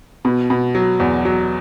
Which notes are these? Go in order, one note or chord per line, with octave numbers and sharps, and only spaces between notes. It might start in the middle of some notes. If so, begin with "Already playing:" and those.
B2
B2
F#3
E2
F#3